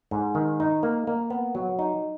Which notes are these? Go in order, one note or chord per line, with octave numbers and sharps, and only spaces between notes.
G#2
D#3
D#4
A#3
A#3
B3
F#3
D#4